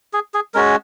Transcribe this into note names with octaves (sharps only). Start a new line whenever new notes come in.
G#4
G#4
G#3 C#4 F#4 A#4